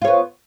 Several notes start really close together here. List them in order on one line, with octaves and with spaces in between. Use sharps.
F4 C#5 B3